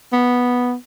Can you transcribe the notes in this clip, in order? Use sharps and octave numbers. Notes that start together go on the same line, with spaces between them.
B3